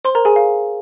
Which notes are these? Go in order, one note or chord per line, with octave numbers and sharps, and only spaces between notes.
C5 C6
A#4 A#5
G#4 G#5
F5